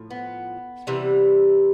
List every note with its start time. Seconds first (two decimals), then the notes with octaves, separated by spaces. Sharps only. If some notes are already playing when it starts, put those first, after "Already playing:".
Already playing: A2 F3
0.10 B3
0.87 C3 E3 G3